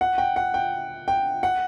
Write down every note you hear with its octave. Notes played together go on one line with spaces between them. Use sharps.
F#5
G5
F#5
G5
G5
F#5